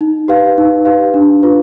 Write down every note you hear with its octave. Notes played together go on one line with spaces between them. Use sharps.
D#4
G4 B4 F5
D#4
G4 B4 F5
D4
F4 B4